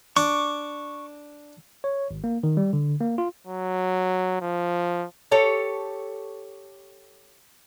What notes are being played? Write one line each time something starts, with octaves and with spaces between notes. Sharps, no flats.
D4 C#6 D6
C#5
G#1
A#3
D#3
G3
D3
A#3
F4
F#3
F3
G4 A4 C#5